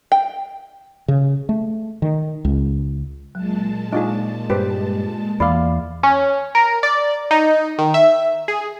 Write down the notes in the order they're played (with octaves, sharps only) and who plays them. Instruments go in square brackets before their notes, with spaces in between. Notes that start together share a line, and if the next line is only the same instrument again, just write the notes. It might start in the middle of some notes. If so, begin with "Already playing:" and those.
[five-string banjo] G5
[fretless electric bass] C#3
A3
D#3
C#2
[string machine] A#2 G#3 A5 [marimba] F#3
[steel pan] D4 F4 G#4 [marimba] D#4 D#5
[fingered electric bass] G2 [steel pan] G4 B4 C5
[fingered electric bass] E2 [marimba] E3 A#3 B5 [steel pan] D5 F5
[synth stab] C#4
A#4
D5
D#4
D#3
E5
G#4